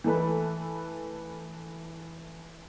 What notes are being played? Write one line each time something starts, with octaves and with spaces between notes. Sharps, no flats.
E3 A3 A4 B4